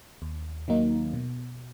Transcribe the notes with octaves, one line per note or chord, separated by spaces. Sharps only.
D#2
D#3 F#3 A#3 D#4
B2